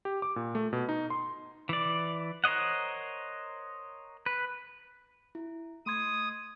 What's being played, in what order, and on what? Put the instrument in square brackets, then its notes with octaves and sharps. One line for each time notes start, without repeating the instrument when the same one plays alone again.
[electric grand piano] G4
D6
A#2
A3
B2
D#4
C6
[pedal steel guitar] E3 D5
A#4 C5 C#5 D#5 F#5
B4
[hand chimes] E4
[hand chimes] A3 C6 G#6 [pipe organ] D#6